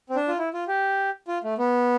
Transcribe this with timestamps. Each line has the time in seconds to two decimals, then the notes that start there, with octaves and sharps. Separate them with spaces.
0.10 C4
0.16 D4
0.28 F4
0.39 E4
0.54 F4
0.68 G4
1.28 F4
1.44 A3
1.58 B3